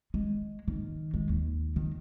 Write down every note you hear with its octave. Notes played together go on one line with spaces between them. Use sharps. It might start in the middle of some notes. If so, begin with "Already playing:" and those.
G#3
D#3
G#3
D#2
D#3